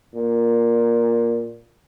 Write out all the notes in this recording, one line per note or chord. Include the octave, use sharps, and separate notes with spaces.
A#2